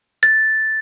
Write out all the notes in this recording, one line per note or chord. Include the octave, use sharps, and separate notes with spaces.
A6